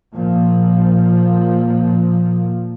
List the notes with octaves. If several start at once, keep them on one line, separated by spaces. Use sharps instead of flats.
A#2 F3